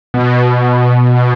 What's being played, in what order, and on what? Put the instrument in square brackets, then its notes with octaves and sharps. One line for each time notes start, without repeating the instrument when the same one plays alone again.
[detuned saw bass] B2